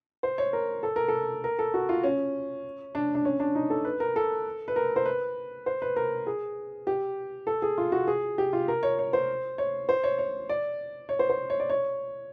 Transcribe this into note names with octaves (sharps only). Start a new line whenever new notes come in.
C5
C#5
A#4
A4
A#4
A4
A#4
A4
F#4
F4
C#4
D4
D4
C#4
D4
D#4
A4
B4
A#4
A4
B4
A#4
C5
B4
C5
B4
A#4
G#4
G4
A4
G#4
F4
F#4
G#4
G4
F4
A#4
C#5
C#5
C5
C#5
C5
C#5
C#5
D5
C#5
C5
C5
C#5
D5
C#5